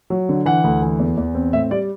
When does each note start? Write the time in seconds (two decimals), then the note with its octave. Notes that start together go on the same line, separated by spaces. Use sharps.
0.10 F#3
0.29 D3
0.46 E3 F#5
0.64 D2
0.82 E3
0.99 E2
1.17 E2
1.35 C4
1.53 A2 E5
1.71 G3 D5